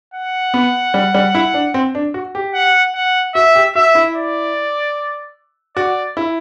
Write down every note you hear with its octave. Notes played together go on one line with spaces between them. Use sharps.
F#5
B3
G3
G3
E4
D4
C4
D4
F#4
G4
F#5
F#5
F#4 E5
G4
F#4 E5
E4
D5
F#4 D5
E4